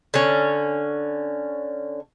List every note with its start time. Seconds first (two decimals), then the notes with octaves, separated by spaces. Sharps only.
0.14 D3 C#4